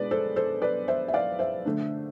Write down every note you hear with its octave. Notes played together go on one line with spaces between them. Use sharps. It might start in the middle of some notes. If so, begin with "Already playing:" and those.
Already playing: B2 G#3 D4 B4 D5
A4 C5
A4 C5
B4 D5
C5 E5
E5
D5 F5
C5 E5
D3 A3 D4